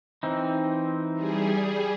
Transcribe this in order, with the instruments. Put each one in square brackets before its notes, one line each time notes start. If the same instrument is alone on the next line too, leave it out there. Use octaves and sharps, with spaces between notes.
[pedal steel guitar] E3 C4 D#4
[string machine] G3 G#4